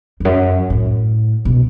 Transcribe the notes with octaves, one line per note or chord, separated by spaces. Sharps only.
E2
F#2
A2
B2